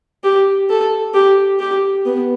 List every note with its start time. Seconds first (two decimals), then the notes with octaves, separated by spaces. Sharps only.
0.24 G4
0.70 A4
1.14 G4
1.60 G4
2.05 B3